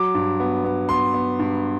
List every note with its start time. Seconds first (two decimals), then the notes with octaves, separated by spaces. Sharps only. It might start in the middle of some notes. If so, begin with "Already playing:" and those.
Already playing: F#3 D6
0.15 G2
0.40 B3
0.64 B3
0.89 B3 C6
1.14 B3
1.39 G2